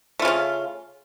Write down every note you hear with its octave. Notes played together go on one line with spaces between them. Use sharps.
C#3 A3 C#4 F4